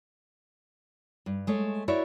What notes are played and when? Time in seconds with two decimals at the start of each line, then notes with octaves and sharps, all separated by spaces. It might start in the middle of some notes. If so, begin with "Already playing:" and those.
1.26 G2
1.47 G#3 A3 C#5
1.88 E4 F#4 A#4 C#5 D5 E5